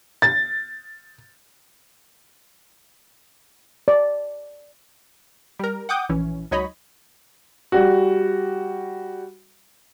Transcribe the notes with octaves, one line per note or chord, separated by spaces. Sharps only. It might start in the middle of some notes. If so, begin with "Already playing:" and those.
A6
D5
G3 A#4
F#5 G5 D6 D#6 G6
A#1 E3 C#4
C#2 F#3 D#4 C#5 D#5 B5
G3 F#4